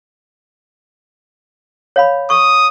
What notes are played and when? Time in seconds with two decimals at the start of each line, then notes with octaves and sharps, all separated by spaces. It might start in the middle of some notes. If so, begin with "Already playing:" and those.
1.96 C#5 F5 B5
2.30 C#6 D#6